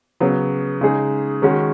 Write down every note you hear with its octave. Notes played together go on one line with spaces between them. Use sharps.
C#3 F#3 B3
C#3 G#3 D#4 G#4
D#3 G#3 C#4 F#4